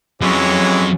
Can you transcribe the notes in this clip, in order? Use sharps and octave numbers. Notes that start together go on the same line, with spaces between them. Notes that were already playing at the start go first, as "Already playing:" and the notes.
F2 E3 F#3 G#3 C#4 C#5